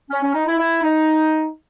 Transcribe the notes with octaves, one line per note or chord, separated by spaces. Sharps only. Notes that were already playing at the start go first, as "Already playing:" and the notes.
C#4
C#4
D#4
E4
E4
D#4